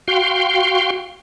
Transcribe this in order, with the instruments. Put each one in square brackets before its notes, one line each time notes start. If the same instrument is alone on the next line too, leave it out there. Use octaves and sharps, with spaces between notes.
[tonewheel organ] F#4 F5 G5 C6